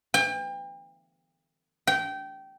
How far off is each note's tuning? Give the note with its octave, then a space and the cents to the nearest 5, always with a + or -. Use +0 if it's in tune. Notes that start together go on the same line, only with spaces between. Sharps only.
G5 +35
G5 -20